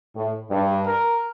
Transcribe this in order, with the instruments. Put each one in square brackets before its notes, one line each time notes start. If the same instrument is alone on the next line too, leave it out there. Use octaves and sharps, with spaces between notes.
[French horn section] A2
G2
[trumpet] A#4